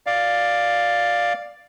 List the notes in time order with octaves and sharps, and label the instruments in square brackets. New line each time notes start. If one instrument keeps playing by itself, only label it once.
[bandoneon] D5 F5